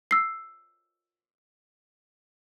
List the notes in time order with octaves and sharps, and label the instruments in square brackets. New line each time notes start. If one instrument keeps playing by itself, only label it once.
[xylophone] E6 C7